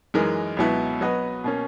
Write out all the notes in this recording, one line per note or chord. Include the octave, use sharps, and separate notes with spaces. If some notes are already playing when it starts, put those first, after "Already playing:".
F#2 E3 G#3 D#4 A#4
C#2 B2 F#3 B3 E4
F#3 B3 F#4 B4 D#5
B2 A#3 C#4